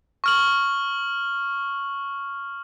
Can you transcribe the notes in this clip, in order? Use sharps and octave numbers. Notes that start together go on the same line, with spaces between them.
C#6 F6 F#7